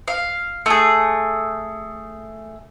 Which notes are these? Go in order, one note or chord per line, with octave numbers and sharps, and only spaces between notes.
F5
A3 G#4